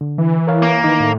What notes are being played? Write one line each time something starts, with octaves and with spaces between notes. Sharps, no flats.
D3
E3
A#4 C#5 F5
A#3
D#3 D#4
A2